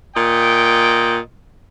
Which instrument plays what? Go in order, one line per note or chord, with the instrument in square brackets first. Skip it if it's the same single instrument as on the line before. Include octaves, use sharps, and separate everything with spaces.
[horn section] A#2 D#5 G5